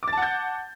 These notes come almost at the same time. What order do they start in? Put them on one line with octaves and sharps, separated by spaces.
D6 A6 A5 F#5 G6